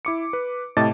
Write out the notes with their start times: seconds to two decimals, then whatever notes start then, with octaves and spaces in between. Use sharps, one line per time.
0.05 E4 D6 C#7
0.33 B4
0.77 A2 C3 D#5 A5 D6 A6